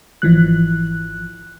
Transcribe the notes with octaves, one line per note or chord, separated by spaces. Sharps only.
G#1 E3 F3 F#6